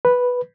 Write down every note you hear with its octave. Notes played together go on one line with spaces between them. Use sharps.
B4